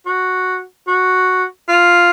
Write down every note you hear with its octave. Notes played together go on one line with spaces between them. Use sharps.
F#4
F#4
F4